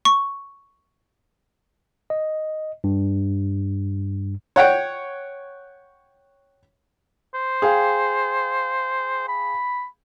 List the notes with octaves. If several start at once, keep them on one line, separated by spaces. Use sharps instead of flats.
C#6
D#5
G2
C#5 F#5 G5
C5
G#4 F5 G5
B5